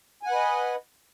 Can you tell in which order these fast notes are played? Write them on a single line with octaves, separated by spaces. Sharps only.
G#5 F#5 B4 D#5